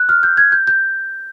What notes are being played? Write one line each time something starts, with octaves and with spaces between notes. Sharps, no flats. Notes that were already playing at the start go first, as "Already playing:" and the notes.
Already playing: F#6
F6
G6
G#6
G6
G6